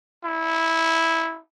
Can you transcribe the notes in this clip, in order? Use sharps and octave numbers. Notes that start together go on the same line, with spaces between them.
E4